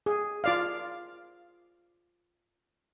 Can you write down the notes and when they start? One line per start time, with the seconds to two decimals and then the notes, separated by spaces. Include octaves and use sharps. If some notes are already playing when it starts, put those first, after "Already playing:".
0.06 G#4
0.44 F4 D5 F5